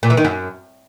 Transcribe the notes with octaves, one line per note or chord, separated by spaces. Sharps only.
A#2
E3
D#3
F#2